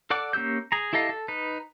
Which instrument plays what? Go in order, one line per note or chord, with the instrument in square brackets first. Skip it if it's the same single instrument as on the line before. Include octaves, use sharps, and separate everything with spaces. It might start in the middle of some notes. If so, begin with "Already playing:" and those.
[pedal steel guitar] A4 D5 F#5 D6
A#3 C#4 G4 E6 G6
G#4 A#5
E4 G4 A4 D#5 F5
A4
D#4 B4